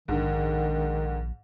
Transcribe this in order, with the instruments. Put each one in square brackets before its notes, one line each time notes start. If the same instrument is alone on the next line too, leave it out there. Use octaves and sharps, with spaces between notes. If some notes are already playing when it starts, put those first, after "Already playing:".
[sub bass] A#1 [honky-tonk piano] G#2 D3 [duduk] D#3